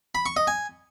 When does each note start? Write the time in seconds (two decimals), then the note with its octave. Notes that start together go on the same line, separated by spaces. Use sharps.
0.15 B5
0.26 C#6
0.37 D#5
0.47 G#5